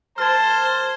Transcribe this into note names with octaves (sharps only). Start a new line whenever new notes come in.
G3 A#4 C5 A5 F6 G#6